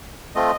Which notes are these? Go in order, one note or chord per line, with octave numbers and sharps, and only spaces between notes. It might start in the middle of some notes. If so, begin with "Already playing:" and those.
A3 C4 F4 D#5